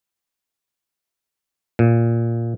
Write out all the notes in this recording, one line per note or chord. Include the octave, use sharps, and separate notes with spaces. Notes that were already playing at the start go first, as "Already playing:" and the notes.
A#2